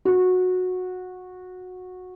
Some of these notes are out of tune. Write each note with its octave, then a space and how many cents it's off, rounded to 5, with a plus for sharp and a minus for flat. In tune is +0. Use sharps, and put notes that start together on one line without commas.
F#4 -15